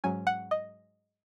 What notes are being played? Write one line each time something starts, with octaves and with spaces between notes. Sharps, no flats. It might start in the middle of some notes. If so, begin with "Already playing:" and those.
G#2 F#3 C#4 G#5
F#5
D#5